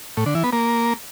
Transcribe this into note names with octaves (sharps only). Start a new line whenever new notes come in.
A2
D3
E3
B3
A#3